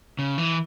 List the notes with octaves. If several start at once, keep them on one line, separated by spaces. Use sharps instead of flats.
C#3
E3